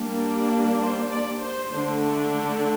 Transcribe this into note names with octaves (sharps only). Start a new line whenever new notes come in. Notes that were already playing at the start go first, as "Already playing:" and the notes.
Already playing: G3 A#3 D4
C5
D5
C5
D3 A3 D4